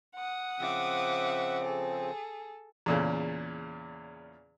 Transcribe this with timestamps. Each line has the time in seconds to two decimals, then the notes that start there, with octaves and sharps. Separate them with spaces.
0.15 F#5 D#6
0.59 C#3 F3 C4 E5 D6
1.64 G#4 A4
2.86 E2 A#2 C#3